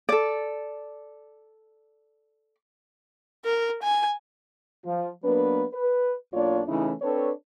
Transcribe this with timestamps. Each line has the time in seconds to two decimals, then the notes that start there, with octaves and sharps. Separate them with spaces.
0.09 A4 D5
3.45 A#4
3.82 G#5
4.85 F3
5.24 F#3 A#3 B3 D4 A#4 B4
5.73 B4
6.34 B1 A#3 D4 F4 C#5 D5
6.68 C#3 E3 A3 C#4 D#4 E4
7.02 C4 D4 A4 B4 C#5